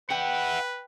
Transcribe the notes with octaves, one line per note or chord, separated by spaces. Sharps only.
E4 B4 F#5 G5